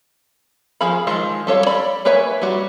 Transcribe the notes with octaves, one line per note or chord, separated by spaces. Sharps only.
F3 G#4 F5 B5
D#3 F3 G#3 F4
G3 A4 C#5 F5
D5 B5
A#3 B4 C#5 E5 G#5
G3 F#4